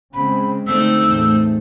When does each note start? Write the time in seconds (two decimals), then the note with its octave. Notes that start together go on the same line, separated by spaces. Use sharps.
0.14 C#3 G#3 C4 B5
0.67 D3 A3 C4 D#4 E6
1.04 E2 A2 A3